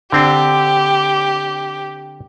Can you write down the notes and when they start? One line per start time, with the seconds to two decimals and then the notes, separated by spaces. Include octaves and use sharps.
0.12 D3 C4 D4 G4